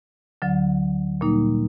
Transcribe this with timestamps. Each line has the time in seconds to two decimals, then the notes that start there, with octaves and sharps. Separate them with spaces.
0.42 D2 D3 F#3
1.21 A#2 G3 A#3 D#4